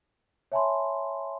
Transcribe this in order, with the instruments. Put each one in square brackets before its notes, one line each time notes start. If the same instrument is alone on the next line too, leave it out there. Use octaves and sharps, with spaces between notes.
[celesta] C#5 E5 G#5 A5 B5 C6